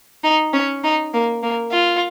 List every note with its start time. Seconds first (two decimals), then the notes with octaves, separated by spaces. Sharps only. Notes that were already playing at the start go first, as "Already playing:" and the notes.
0.24 D#4
0.53 C#4
0.84 D#4
1.13 A#3
1.43 A#3
1.71 F4